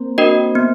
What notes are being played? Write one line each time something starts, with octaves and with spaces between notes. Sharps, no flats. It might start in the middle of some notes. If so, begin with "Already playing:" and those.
Already playing: A#3 C4
D4 F#4 A#4 D#5
B3